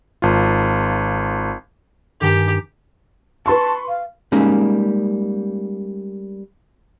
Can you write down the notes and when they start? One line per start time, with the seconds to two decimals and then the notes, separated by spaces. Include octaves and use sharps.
0.22 G#1 F4
2.21 G2 D#3 G4 G#5
3.46 B4 A5 C6 C#6
3.88 F5
4.32 G3 G#3 A#3 C#4 D#4